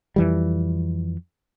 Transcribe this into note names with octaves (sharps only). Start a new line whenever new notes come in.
F2 E3 G3